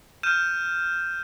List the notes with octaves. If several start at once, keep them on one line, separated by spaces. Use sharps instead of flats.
F6 G6 D#7 E7